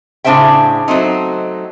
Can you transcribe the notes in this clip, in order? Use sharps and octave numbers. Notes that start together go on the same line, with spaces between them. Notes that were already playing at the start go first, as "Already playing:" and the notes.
A2 C#3 D4 C5 E5 G5
F#3 A3 C4 D#4